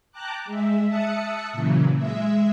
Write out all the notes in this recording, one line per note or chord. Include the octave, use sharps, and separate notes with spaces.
G5 A5 A#5 D6 F#6
G#3 E5
E5 A5 D#6 F#6 C#7
A#2 C#3 E3 F#3
G#3 E5